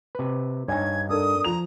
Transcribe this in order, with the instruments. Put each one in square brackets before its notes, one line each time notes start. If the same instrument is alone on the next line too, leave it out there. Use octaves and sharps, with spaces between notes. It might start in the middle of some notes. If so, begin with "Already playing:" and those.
[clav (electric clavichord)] C3 B4
[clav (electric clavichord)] G2 D#4 [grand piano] C#5 G#5 [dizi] G#6
[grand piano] D4 A4 A#4 [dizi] D#6
[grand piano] F3 F7 [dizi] A#5